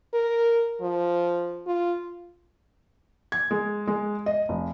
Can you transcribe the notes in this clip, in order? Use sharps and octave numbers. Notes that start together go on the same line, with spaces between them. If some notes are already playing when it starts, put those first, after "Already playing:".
A#4
F3
F4
G#6
G#3
G#3
D#5
F1